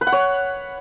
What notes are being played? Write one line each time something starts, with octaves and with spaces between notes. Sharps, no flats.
B4
F#5
C#5